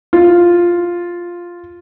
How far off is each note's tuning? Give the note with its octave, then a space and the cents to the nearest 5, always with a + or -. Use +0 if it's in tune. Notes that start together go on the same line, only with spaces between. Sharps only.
F4 +0